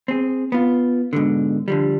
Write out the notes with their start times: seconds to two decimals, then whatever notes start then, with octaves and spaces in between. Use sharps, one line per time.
0.08 C4 G#4
0.52 B3 F4
1.13 G#2 B2 D3
1.68 D3 F3 G3